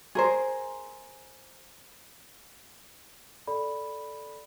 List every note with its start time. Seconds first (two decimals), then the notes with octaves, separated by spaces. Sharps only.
0.15 G#4 A#4 C5
3.47 A4 D5 B5